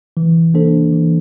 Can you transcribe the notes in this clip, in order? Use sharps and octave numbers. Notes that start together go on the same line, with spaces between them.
E3
A#3 D4 A4 C5
E3